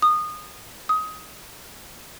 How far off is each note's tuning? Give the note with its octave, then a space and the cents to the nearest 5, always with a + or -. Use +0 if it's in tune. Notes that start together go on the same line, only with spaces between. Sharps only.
D#6 -20
D#6 +20